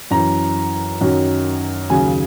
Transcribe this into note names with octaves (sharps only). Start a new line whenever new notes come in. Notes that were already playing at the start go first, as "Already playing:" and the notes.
F#2 E3 A#5
F#2 D#3 F#3
D#2 C#3 F#3 G#5